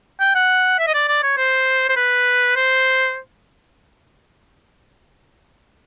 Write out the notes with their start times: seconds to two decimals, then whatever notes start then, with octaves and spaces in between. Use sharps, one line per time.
0.20 G5
0.35 F#5
0.79 E5
0.87 D#5
0.94 D5
1.08 D5
1.23 C#5
1.37 C5
1.89 C5
1.96 B4
2.56 C5